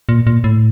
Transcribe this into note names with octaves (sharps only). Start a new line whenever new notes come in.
A#2
A#2
A2